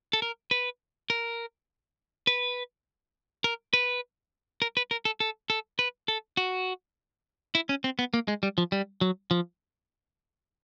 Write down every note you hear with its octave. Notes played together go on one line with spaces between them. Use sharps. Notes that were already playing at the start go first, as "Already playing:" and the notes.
A4
A#4
B4
A#4
B4
A#4
B4
A#4
B4
A#4
A4
A4
A4
B4
A4
F#4
E4
C#4
C4
B3
A#3
G#3
G3
F3
G3
F#3
F3